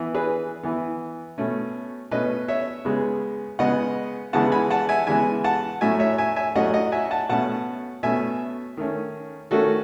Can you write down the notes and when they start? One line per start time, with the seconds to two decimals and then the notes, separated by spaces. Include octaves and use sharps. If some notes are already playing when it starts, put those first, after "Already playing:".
Already playing: E3 B3
0.15 G#4 B4
0.63 E3 B3
1.38 B2 A3 C#4
2.11 B2 A3 C#4 B4 D#5
2.48 C#5 E5
2.85 C#3 G#3 B3
3.59 C#3 G#3 B3 D#5 F#5
4.33 C#3 E3 G#3 B3 F#5 A5
4.52 G#5 B5
4.70 F#5 A5
4.89 E5 G#5
5.07 C#3 E3 G#3 B3 E5 G#5
5.44 F#5 A5
5.81 A2 F#3 A3 C#4 E5 G#5
5.99 C#5 E5
6.18 E5 G#5
6.36 E5 G#5
6.55 A2 F#3 A3 C#4 D#5 F#5
6.74 D#5 F#5
6.92 E5 G#5
7.11 F#5 A5
7.29 B2 A3 C#4 F#5 A5
8.03 B2 A3 C#4 E5 G#5
8.77 D#3 A3 C#4
9.51 D#3 A3 C#4 F#4 A4